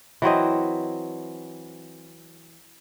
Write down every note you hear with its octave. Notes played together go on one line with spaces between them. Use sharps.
E3 F#3 C4 D#5